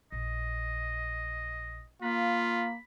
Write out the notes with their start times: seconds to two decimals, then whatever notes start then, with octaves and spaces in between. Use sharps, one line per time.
0.12 A#1 D#5
2.03 A#3 F4 B5